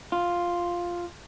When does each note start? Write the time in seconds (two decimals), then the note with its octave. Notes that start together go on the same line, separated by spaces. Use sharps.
0.12 F4